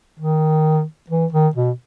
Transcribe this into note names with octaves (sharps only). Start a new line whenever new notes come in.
D#3
E3
D#3
B2